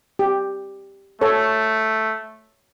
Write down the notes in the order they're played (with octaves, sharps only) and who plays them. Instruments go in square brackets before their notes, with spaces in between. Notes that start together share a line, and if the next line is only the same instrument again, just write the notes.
[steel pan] G4
[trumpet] A3 [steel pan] A4 C#5